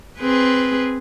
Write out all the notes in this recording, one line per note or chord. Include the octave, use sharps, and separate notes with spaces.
C4 G#4 B4